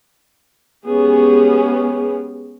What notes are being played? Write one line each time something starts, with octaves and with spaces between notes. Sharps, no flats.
G#3 B3 C#4 G4 G#4